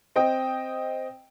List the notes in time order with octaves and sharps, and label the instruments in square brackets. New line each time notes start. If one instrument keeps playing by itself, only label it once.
[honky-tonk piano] C4 D#5 G5